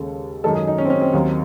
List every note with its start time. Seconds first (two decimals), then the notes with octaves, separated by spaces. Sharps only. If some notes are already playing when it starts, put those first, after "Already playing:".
Already playing: D#2 C#3 G#3 A4
0.44 F#2 D#3 G#3 A4
0.55 G#4
0.67 D#4
0.78 C#4
0.85 C4
0.90 C#4
1.01 C4
1.13 D#2 D#3 F#3